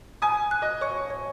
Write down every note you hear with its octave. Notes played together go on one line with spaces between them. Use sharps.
G#5 D#6
F#6
D#5
C#5 C#6
C#5